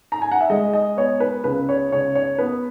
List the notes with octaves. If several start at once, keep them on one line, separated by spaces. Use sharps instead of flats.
A#5
G#5
F#5
E5
G#3 D#5
D#5
B3 C#5
B4
C#2 B4
C#5
C#2 C#5
C#5
B3 B4